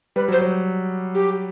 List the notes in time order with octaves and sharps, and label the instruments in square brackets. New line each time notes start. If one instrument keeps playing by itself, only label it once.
[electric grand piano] G3 [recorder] B4
[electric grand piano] F#3 [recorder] C5
[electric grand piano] F#3
[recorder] G4